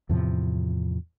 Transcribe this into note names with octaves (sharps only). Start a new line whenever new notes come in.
E2 A2 C3 F3